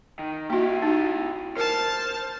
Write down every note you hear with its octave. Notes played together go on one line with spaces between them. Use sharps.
D#3
A#3 E4 F#4 G4
D#4 F#4
A#4 C5 A5 F6